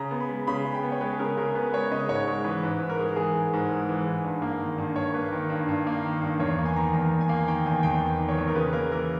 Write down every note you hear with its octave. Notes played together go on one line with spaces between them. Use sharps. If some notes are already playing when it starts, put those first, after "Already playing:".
Already playing: C#3 A#5
B3
B5
G#3
C#3 B5
C#3
G5
B3
C#5
G#3 B4
G#4
C#3 A#4
C#3 A#4
B3 B4
G#3 C#5
C#3 D#5
G#2 C#5
G#3 C#5
E3 B4
G#2
G#2
A#4
G#3
E3 G#4
G#2
G#2
G#3
E3
G#2
G2
A#3
D#3
G2
G2 C#5
A#3 B4
D#3
G2
G2
A#3
D#3
G2
E2 C#5
A#3
G#5
D#3 A#5
E2 A#5
E2
G#5
A#3
D#3 G5
E2 G#5
E2 G5
A#3
D#3
C#5
E2
A#4
C#3 B4
A#3 A#4
E3 A#4